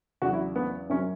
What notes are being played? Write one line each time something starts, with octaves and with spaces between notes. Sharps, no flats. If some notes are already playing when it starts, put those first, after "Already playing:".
E2 C#3 F#3 F#4
E4
B3
F#2 F#3 C#4